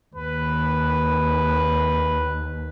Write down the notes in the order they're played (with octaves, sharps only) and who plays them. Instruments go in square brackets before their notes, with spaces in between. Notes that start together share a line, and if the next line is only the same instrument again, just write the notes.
[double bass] D#2 [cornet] B4